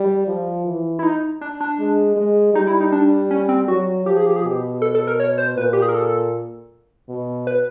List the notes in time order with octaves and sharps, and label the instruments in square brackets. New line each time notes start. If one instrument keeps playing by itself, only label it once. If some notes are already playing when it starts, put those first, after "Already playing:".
Already playing: [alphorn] G3
F3
E3
[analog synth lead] E4
D#4
D4
D4
[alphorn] G#3
G#3
[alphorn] G3 [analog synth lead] D#4
[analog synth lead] E4
D#4
D4
C#4
C4
[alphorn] F#3 [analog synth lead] F#4
[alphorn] F3 [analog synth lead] G4
[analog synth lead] G#4
G4
G#4
[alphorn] B2 [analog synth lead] G4
[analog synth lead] A4
A4
A#4
C#5
C5
[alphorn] A#2 [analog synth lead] B4
[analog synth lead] G4
G#4
A#4
A4
[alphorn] B2
[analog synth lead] B4